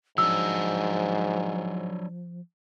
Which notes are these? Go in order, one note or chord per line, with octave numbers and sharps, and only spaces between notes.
G#2 F3 F#3 D4 E6